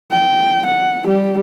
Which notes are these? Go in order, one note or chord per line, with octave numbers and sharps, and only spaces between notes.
G5
F#5
G3 G4